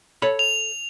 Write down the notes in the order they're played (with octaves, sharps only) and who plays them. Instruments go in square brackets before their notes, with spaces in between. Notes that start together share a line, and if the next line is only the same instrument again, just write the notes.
[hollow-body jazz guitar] A4 C#5 B5
[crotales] F7